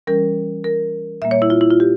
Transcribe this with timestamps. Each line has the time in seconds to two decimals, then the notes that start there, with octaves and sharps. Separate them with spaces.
0.07 E3 G3 C#4 A#4
0.64 A#4
1.22 A#2 G3 A#3 E5
1.31 C#5
1.42 E4
1.50 F4
1.61 E4
1.71 F4
1.80 G4